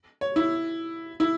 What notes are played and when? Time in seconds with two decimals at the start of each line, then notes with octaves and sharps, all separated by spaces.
0.21 C#5
0.36 E4
1.20 E4